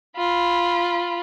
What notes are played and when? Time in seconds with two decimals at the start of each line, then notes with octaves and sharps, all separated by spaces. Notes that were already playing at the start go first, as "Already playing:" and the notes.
0.16 F4 B5